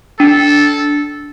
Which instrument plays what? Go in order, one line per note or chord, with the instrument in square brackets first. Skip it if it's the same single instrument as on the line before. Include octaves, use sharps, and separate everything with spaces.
[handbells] D4 [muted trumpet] A4